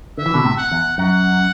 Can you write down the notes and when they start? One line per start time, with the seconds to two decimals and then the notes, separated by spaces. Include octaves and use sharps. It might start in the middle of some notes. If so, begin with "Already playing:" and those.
0.18 D3 E5
0.26 E3
0.34 B2 D3
0.44 A2 C3
0.58 F#5
0.72 E2
0.97 F#2 F#5